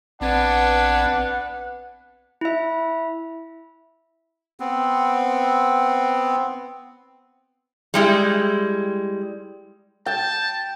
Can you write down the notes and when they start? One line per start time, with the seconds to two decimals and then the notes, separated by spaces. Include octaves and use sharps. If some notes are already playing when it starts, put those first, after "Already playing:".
0.21 A#1 B3 C4 D4 B4 F#5 G#6
2.41 E4 E5
4.60 B3 C4
7.94 G3 G#3 E4
10.06 G5 A5